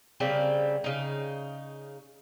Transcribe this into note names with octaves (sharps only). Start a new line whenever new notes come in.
C#3 G3 A#3 C4
C#3 D#4